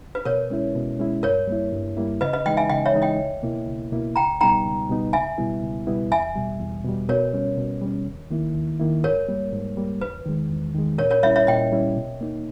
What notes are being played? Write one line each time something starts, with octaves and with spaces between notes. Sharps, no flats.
B4
B2 A#4 C#5
G#3 C#4 E4
B2
G#3 C#4 E4
G2 A#4 C#5
G3 A#3 E4
G2
G3 A#3 E4
C#3 B4 D#5
B4 D#5
E3 G#3 D#4 D#5 G5
E5 G#5
C#3 D#5 G5
C#5 E5
E3 G#3 D#4
D#5 G5
C#2
B2 A#3 E4
C#2
B2 A#3 E4
C#2 G5 A#5
B2 G3 B3 D#4 G5 A#5
C#2
B2 G3 B3 D#4
C#2 E5 G#5
B2 G3 B3 E4
C#2
B2 G3 B3 E4
E2 E5 G#5
B2 G3
E2
B2 G3
B2 A#4 C#5
G3 C#4
B2
G3 C#4
D#2
D#3 A#3 E4
D#2
D#3 A#3 E4
G#2 A#4 C#5
G3 A#3
G#2
G3 A#3
E2 B4
D#3 G#3
E2
D#3 G#3
A#2 A#4 C#5
A#4 C#5
G3 C#4 E4 C#5 E5
C#5 E5
A#2 D#5 G5
G3 C#4 E4
B2
A#3 D#4